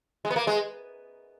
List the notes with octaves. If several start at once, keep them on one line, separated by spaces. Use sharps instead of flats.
G#3
B3
A#3
G#3